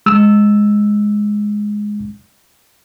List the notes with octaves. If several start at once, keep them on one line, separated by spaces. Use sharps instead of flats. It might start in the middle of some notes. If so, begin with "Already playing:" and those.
G#3 E6